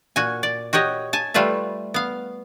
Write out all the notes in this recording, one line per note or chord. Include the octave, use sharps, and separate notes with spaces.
A#2 F#4 G#5
D5
F#4 G4 C#5 D#5
G#5 A5
G3 A3 F4 B4 E5
B3 F5